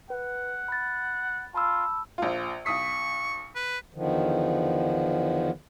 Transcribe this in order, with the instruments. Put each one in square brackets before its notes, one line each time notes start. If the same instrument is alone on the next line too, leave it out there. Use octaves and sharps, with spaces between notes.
[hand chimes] B4 [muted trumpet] F#5
[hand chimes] B5 A6
[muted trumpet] F4 [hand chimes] A5 B5 E6
[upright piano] A#1 F4
[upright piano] B1 D#6 B6 [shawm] C#6
[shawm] B4
[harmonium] E2 D3 D#3 F3